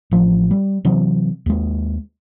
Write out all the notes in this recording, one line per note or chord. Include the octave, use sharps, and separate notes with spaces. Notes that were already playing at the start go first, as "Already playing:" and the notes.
A1 F3
G3
C3 E3 F#3 C4
D#2 G#3